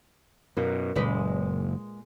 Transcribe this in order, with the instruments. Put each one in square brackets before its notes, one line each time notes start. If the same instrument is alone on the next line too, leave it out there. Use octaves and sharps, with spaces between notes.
[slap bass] F#2 B2 [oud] A#3
[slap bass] F#1 [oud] A#2 G#3 B4